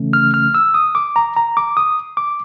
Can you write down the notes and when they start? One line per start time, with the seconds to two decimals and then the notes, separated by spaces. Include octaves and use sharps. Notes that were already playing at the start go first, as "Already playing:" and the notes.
Already playing: C#3 E3 A3 C#4
0.13 F6
0.34 F6
0.54 E6
0.74 D#6
0.95 D6
1.16 A#5
1.36 A#5
1.57 D6
1.77 D#6
2.17 D6